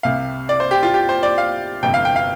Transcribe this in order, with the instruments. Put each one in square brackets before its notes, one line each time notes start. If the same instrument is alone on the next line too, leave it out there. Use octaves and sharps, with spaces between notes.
[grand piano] C2 C3 F5
D5
C5
G4
F4
G4
C5
D5
F5
G1 F2 C3 G5
F5
G5
F5